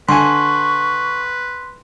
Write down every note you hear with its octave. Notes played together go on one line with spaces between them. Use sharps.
D3 B4 G#5 C6 C#6